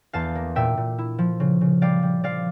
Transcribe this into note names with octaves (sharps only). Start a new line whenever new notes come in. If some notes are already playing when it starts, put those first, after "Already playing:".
E2 F5 A5
A#3
A#2 E5 G5
A#2
E4
F3
C#3
C#3
G3 D5 F5
G3
F3 D5 F5